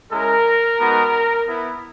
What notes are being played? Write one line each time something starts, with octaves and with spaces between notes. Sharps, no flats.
G#3 C#4 E4 A#4
G#3 B3 D#4 F#4
B3 E4